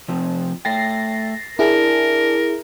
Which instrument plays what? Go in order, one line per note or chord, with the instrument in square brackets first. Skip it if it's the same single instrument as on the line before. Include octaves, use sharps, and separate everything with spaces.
[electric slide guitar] C3 F3 C4
[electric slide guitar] A3 G5 [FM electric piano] A6 A#6 C7
[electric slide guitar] D4 [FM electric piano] E4 G#4 [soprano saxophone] A#4